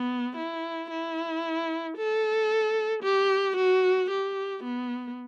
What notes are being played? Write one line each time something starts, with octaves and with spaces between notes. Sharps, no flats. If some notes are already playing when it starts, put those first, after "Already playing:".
Already playing: B3
E4
E4
A4
G4
F#4
G4
B3